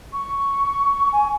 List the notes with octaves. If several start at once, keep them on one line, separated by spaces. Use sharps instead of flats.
C#6
G#5